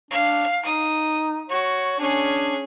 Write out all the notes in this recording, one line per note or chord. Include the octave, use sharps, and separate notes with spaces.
D4 F5
D#4 D#6
F#4 C#5
C#4 D4 G#4